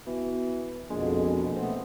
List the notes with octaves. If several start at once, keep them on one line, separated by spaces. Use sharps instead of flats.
B2 E3
A#1 F2 B2 G#3
A3 B3 C4